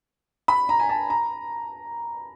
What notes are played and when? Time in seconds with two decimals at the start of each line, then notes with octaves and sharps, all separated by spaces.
0.48 B5
0.69 A#5
0.80 G#5
0.89 A5
1.10 A#5